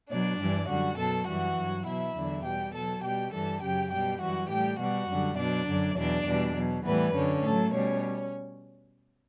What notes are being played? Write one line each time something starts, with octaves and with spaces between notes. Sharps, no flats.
B2 F#3 D4 D5
G2 E3 G3
F#2 D3 G3 F#4 F#5
B2 F#3 A4 A5
F#2 E3 G3 F#4 F#5
G2 F#3
B2 F#3 E4 E5
E2 D3 F#3
B2 G3 G4 G5
B2 F#3 A4 A5
B2 G3 G4 G5
G2 E3 G3 A4 A5
F#2 C#3 F#3 G4 G5
B2 G3 G4 G5
F#2 E3 G3 F#4 F#5
A2 G3 G4 G5
B2 G3 F#4 F#5
F#2 D3 G3
B2 F#3 D4 D5
F#2 D3 F#3
E2 B2 F#3 D4 D5
E2 B2 G3
B2 F#3
A2 E3 G3 B3 B4
F#2 D3 F#3 C#4
A2 F#3 A3 A4
B2 G3 C#4 C#5